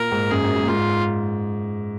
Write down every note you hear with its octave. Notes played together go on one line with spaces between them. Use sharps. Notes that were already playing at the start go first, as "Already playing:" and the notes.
Already playing: A#2 A#4
G#2
F#2 G#4
F#2
G#2
A#2
G#2 F4